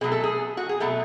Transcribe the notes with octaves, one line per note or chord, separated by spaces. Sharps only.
B2 F#3 A3 G#4
A4
G#4
F#4
G#4
B2 F#3 A3 A4